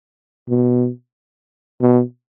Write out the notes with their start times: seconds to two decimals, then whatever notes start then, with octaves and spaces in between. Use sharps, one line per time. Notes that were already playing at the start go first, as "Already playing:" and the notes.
0.49 B2
1.81 B2